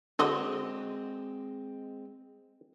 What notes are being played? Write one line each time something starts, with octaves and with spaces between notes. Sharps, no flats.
D3 G#3 C4 F#4 D#5